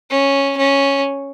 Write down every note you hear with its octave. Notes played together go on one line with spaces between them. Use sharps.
C#4
C#4